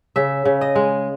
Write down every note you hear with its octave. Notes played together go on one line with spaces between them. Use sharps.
C#3 E5
C#3
D#5
G#3